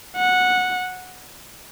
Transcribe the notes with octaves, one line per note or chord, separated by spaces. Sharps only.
F#5